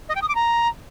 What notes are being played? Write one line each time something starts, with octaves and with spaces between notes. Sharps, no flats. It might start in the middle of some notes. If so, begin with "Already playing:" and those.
D#5
G5
D#6
D6
A#5